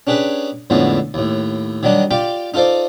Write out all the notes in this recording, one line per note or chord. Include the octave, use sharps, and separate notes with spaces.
C#4 D4 G4 G#4 B4
F2 A2 D3 G#3 B3 C#4
D#2 A2
D#3 F#3 G3 D4 D#4
F4 G4 D5 G5
D#4 F4 A4 C5 D5